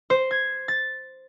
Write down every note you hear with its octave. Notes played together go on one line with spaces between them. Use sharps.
C5
G#6
A6